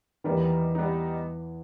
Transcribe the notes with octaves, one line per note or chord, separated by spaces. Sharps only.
E2 D#3 E3 G3 A#3 D#4
G3 B3 D#4